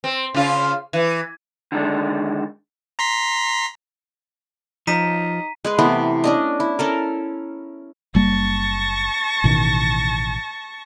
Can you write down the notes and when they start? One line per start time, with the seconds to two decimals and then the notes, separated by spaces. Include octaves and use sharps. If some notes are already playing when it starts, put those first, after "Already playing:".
0.04 C4
0.34 C#3 F4
0.93 E3
1.72 D3 D#3 G#3 D4
2.99 A#5 C6 B6
4.87 F3 D#4 A#5 B6 D#7
5.65 G#3 G#4 B4
5.79 C3 E3 A3 B3
6.24 C#4 D4 D#5
6.60 E4
6.79 C#4 A4 A#4
8.15 F#1 G3 A#3 A5 C#6 A#6
9.44 A1 B2 D#3